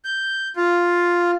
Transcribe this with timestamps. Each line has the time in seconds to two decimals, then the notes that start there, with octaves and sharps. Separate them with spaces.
0.04 G6
0.56 F4